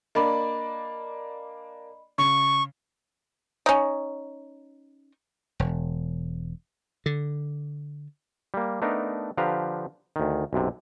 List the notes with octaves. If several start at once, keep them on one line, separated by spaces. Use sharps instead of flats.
A#3 D4 D5 D#5 B5
C#3 C#6
C#4 D#4
E1
D3
G3 A#3
A3 B3 D4 D#4 A#4
D3 F3 G4 B4 F5 A#5
D2 D#3
B1 F#2 C3